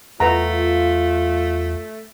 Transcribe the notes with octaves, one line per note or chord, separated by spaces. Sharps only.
E2 A3 F4 B4 F#5 A#5